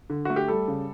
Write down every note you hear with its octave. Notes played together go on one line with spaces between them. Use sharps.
D3
A3 F#4
G4
G3 A4
C#3